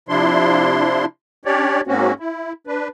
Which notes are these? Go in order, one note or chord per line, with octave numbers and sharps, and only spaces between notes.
C3 F3 D4 E4 C6
C#4 D4 G4 C#5 D5
G#2 A#3 C4 C#4 F#4
E4
D4 B4